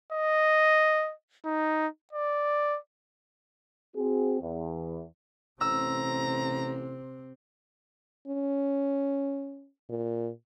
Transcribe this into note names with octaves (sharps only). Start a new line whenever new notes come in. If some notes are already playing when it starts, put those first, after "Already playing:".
D#5
D#4
D5
C4 F#4 G#4
E2
A1 C3 C4 A#5 E6
C#4
A#2